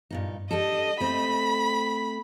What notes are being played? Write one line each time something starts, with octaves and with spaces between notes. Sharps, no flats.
G2 A#2 D#4
G3 D4 A4 D#5
A3 C4 B5